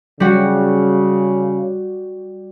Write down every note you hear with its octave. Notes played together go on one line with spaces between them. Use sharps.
C#3 G3 F#4